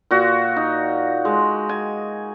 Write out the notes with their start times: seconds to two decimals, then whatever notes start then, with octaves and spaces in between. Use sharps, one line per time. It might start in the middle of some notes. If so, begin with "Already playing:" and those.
0.11 A#2 F#4
0.56 D#4
1.25 G#3
1.69 G#5